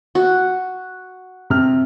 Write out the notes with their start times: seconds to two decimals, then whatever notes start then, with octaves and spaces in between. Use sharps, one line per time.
0.15 F#4
1.50 C3 F6